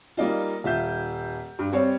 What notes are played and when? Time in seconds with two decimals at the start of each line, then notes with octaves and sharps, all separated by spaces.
0.17 G3 A#3 D#4 F4
0.64 D#1 F4 E5 G6
1.59 G2
1.72 G3 C4 C#5